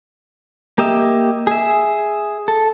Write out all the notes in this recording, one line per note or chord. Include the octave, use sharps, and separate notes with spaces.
A#3 G4 D#5 E5
G#4 E5
A4